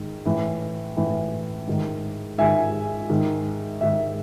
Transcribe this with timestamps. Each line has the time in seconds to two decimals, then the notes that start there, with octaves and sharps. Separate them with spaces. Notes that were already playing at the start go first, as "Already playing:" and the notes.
Already playing: G#2 D#3
0.25 A2 E3
0.96 A2 E3
1.67 G#2 D#3
2.38 G#2 D#3 E5 G#5
3.09 G#2 D#3
3.81 G#2 D#3 E5